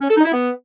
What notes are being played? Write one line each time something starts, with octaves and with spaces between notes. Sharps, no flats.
C#4
A4
D#4
E4
B3